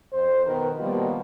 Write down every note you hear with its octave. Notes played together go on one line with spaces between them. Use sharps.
F2 C5
B2 D#3 A#4 B4
B2 D#3 F3 G3 A#3